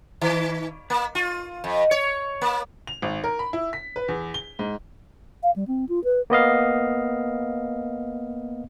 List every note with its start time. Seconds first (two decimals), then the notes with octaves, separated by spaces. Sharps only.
0.21 D#3
0.90 A#3
1.15 F4
1.64 F2
1.91 C#5
2.42 A#3
2.87 F7
3.02 G#1
3.24 A#4
3.39 B5
3.53 E4
3.73 B6
3.96 B4
4.08 E2
4.34 G7
4.59 G#2
5.43 F5
5.56 G3
5.68 C4
5.89 F4
6.04 B4
6.30 A#3 B3 D#5 F5